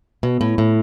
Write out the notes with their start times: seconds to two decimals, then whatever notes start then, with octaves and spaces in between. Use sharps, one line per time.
0.23 B2
0.41 A2
0.58 A2